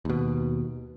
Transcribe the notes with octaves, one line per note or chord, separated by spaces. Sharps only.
D#2 B2